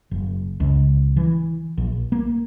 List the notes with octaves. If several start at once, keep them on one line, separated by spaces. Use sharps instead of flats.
F#1
C#2
E3
A#1
A#3